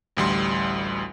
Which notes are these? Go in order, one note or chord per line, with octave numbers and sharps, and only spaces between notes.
A1 D2 G3 C6